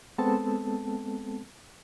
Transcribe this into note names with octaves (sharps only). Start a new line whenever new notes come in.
G#3 B3 C4 A4 A5